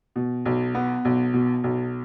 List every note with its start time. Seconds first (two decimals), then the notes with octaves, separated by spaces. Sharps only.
0.16 B2
0.46 B1
0.75 B3
1.05 B1
1.34 B2
1.64 B1